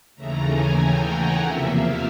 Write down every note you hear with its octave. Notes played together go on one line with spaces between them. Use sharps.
D#2 C#3 E3 A3 A#5
G#5
G5
F#5
E2 C3 F3 A#3 E5
F5